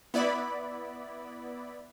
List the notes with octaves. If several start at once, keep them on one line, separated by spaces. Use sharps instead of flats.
B3 E4 D5 B5